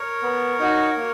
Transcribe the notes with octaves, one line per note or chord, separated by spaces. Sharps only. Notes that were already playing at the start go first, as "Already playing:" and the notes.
Already playing: A#4 C#5
B3
D#4 F#4
A#3